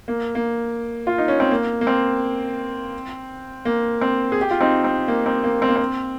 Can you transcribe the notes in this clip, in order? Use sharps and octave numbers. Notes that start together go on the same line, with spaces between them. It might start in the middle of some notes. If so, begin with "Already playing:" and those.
A#3
A#3
F4
D#4
C#4
C4
A#3
A#3
C4
A#3
C4
G#4
G4
F4
C4 D#4
C4
A#3
C4
A#3
C4
A#3
C4